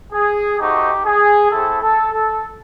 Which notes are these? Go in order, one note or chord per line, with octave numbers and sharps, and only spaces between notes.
G#4
A3 C4 D#4 F#4 G4
G#4
A3 C4 E4 A4
A4
A4